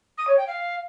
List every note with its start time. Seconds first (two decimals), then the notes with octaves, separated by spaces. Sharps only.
0.18 D#6
0.27 C#5
0.37 G5
0.47 F5